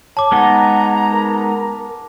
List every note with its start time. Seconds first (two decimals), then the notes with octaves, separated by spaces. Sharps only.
0.17 C#5 A5 D6
0.32 G#3 B3 D#4 F#5 A#5
1.12 A#4